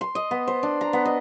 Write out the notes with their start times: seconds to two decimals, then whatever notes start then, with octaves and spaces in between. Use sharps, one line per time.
0.01 C6
0.15 D#5
0.31 B3
0.48 C5
0.63 D4
0.81 A#5
0.93 B3
1.05 D#5